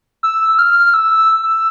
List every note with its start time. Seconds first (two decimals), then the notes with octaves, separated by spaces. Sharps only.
0.23 E6
0.59 F6
0.94 E6